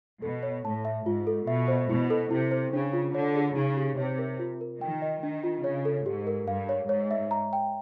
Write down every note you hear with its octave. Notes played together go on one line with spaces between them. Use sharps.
B2 A4
C#5
A2 A5
E5
G#2 F4
A4
B2 E5
C5
B2 E4
A4
C3 E4
C5
C#3 D4
F4
D3 C#5
G#4
C#3 D#4
G4
C3 C#5
A#4
F4
A#4
D#3 G5
D#5
D#3 D4
F4
C#3 C#5
A4
G#2 G4
A#4
G2 F5
C#5
G#2 C#5
E5
A#5
G5